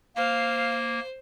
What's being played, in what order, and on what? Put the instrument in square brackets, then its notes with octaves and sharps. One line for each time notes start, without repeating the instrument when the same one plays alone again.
[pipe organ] A#3 [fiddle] C5 [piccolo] F5